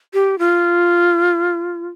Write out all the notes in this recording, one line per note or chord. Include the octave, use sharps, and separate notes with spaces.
G4
F4